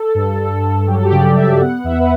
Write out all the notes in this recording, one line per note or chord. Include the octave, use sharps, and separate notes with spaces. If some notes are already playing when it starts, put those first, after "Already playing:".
Already playing: A4
G2
G2
G2
F#3 G4
A4
G4
C#3 D5
C#3 E5
B3 F#5
E2 E5
B4